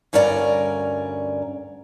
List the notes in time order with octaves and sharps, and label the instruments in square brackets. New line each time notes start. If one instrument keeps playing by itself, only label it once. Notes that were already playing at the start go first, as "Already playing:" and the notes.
[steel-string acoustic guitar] D2 G2 C#4 A#4 D5 A#5